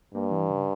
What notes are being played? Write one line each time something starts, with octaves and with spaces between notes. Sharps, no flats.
G2 A#3
E3
C#3